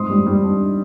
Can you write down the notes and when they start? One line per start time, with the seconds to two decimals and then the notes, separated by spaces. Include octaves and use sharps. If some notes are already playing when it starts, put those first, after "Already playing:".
Already playing: G#2 C4 C6 D#6
0.10 G3
0.27 G3
0.44 D4